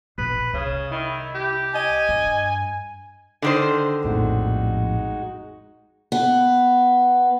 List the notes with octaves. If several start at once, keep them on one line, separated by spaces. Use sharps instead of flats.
A#1 B4
C2 C#3
D#3 E4
G4
D#5 G#5
G2
D3 D#3 C5
A#1 F2 A2 G#3 D#4 F#4
B3